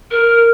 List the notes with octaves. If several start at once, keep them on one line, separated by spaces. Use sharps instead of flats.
A#4